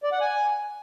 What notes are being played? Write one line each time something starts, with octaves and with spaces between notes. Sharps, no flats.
D5
F#5
G#5